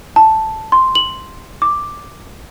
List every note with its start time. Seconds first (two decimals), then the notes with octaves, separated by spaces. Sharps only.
0.16 A5
0.72 C6
0.95 F#7
1.62 D6